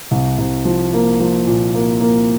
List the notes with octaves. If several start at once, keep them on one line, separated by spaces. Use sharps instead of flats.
C2
C2
F3
A#3
F3
A#2
A#3
A#3